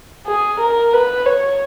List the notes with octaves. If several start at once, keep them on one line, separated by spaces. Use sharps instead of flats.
G#4
A#4
B4
C#5